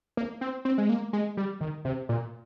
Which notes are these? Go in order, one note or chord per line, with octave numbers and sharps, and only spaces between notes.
A#3
C4
C4
G#3
A#3
G#3
G3
D#3
C3
A#2